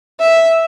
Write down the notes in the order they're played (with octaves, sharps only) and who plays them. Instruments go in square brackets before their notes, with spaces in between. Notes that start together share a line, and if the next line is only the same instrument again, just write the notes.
[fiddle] E5